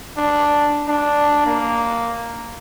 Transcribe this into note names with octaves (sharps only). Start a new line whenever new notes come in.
D4
D4
A#3